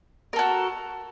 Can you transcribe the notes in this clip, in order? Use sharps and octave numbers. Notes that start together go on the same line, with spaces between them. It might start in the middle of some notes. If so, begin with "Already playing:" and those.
F#4 A4 A#4